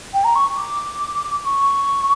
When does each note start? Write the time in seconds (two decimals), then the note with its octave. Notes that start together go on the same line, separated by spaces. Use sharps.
0.13 G5
0.24 A#5
0.35 C#6
0.57 D6
1.45 C#6